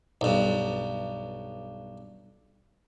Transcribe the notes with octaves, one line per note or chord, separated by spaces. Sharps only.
B1 G2